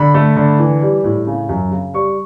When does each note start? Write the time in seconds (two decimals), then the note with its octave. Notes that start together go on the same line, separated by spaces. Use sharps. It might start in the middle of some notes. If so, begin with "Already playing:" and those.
Already playing: D3 B5
0.14 A3
0.37 D3
0.59 E3
0.82 G3
1.04 A2
1.27 C#3
1.49 F#2
1.71 C#3
1.94 G3 C#6